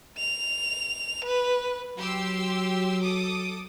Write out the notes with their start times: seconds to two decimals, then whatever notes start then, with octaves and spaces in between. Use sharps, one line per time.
0.18 F7
1.25 B4
1.98 F#3 G4 C6 E6
3.00 A4 D6 D#6